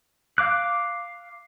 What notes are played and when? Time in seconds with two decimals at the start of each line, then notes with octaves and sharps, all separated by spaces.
0.38 F5 D6 F#6